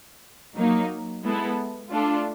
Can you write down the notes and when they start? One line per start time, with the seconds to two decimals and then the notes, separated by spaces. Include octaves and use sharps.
0.56 F#3 A#3 D#4
1.24 G#3 B3 E4 A4
1.91 A3 D4 F4 A4